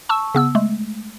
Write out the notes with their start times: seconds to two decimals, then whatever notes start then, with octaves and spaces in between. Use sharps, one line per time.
0.09 A5 C#6 E6
0.35 C#3 B3 E6
0.55 G#3 A3